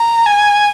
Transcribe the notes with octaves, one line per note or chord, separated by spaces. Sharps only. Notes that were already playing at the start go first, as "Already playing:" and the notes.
Already playing: A#5
G#5